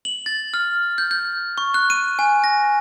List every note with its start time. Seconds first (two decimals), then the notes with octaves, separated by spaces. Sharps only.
0.05 F#7
0.26 A6
0.54 F6
0.98 G6
1.11 G6
1.58 C#6
1.74 F#6
1.90 D#7
2.19 G#5
2.44 A#6